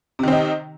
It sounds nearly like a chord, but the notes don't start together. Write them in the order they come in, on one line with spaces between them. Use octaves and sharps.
C3 D#3 C4 D#4